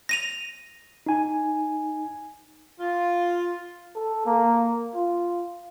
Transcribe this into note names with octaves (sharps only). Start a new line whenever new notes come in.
A#6 D#7 F7
D#4 G#5
F4
A4
A#3
F4